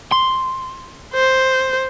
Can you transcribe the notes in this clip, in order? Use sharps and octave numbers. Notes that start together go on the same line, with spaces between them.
C6
C5